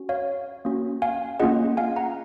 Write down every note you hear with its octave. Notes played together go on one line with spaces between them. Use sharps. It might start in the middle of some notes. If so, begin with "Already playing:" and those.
Already playing: C#4 F#4
C#5 F5
A#3 C#4 F#4
F5 G#5
A#3 C#4 F4 G#4 D#5 F#5
F5 G#5
F#5 A#5